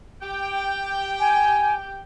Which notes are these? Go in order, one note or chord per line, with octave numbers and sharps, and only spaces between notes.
G4 G5
G#5